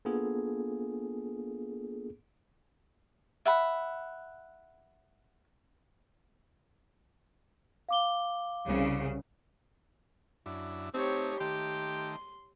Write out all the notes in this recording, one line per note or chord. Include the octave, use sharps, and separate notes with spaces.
A#3 B3 D4 F4 G#4 A4
E5 F#5 B5
F5 D6 G7
C2 C#3
F#2 D4 E4
A3 C4 D#4 G4 C#5
D#3 A3 G4 C6